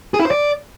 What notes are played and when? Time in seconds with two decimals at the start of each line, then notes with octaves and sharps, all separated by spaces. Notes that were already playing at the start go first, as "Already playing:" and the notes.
0.14 G#4
0.20 E4
0.25 C5
0.31 D5